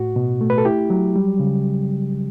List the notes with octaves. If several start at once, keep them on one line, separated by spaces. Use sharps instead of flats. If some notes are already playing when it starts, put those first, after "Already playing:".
Already playing: A2 F#4
B2
A3
B4
A4
E4 G4
F#3
G3
C#3